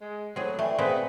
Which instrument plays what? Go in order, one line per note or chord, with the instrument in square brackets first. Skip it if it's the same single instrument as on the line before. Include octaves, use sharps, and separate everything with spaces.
[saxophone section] G#3
[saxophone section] A2 F#3 [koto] C4 G#4
[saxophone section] E3 [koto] A3 [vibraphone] D5 G5 G#5
[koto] A#2 A3 C4 [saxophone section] B3 G#4 B4